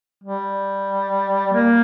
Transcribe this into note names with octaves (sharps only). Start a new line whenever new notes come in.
G3
A#3